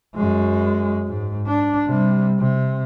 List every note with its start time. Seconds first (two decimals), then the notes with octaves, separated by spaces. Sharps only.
0.15 F#2 G#3
1.07 G#2
1.47 D4
1.86 C3 G3
2.40 C3